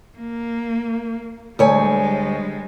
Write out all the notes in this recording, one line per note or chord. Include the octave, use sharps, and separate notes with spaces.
A#3
D2 G3 G#3 C#5 G#5